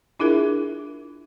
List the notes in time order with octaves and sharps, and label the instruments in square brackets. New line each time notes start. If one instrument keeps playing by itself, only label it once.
[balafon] D4 E4 F4 G#4 A#4 E5